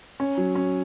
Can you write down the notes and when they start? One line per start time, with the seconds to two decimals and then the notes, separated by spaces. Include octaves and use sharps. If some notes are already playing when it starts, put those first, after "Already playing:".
0.20 C#4
0.37 F#3
0.55 C#4